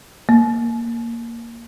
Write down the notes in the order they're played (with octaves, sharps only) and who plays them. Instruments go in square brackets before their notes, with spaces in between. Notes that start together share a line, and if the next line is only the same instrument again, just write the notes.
[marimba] A#3